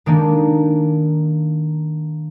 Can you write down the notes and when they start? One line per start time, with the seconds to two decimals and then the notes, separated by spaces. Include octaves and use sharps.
0.06 D#3 G#3 A#3 D4 D#4